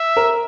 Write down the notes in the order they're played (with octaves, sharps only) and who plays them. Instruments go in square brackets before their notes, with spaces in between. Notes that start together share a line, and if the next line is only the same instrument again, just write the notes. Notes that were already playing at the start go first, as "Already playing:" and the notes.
Already playing: [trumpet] E5
[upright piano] A#4